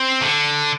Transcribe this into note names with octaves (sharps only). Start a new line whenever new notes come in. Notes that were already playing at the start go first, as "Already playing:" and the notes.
Already playing: C4
D3